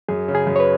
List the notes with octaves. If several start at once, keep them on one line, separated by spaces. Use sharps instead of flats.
F#2 G#4
C#3
G#4
F#2
C#5
B4